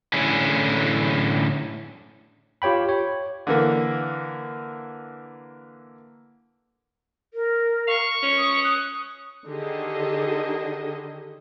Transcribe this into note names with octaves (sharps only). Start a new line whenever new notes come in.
A2 D3 C#4 E4 G#4
F4 G4 C#5 G5 B5
C#5
D3 E3 A#3
A#4
F5 C#6
C#4
D#6
F#6
D3 D#3 G4 G#4 D#5